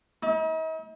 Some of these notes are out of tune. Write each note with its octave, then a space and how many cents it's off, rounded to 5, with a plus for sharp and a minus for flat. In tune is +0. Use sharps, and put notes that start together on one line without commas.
D#4 +45